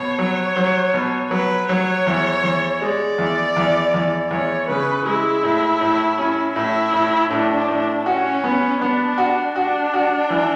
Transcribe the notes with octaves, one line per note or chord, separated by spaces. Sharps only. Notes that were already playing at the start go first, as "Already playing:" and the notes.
Already playing: B2 C#5
F#3
F#3
B2
F#3 B4
F#3 C#5
E2
E2
G#3 D5
E2
E2
E2
E2 C#5
C#3 B4
G#3 E4
A2
A2
C#4
A2 E4
A2
A2 D4
A2
C#4 F#4
B3
B3 D4
F#4
D4 F#4
F#4
E3